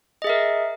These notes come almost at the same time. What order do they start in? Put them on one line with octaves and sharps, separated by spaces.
D#5 G#4 E5 A#4